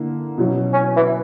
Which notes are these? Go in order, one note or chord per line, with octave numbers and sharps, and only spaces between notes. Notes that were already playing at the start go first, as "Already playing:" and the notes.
Already playing: D3 A#3 E4
B2 F#3 C#4 E4
C#4
E3